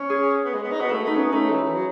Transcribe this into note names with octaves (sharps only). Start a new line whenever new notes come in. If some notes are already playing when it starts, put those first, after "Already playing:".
Already playing: C#4
G#4
B3
G#3
B3
D#4
B3 F#4
A3 E4
A3 D#4
B3 C#4
A3 D#4
E3
E3
F#3